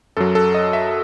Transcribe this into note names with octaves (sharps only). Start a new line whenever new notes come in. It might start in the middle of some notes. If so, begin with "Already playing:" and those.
F#2 F#3 A4
A4
D#5
E5